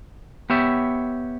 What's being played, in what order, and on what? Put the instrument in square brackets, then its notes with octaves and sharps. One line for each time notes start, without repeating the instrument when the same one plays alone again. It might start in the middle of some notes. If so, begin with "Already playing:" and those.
[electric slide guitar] B3 G4 C#5 E5